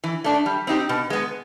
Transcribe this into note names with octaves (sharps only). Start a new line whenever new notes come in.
E3
A3 D4
G3
C4 D#4 G4
B2
G#3 B3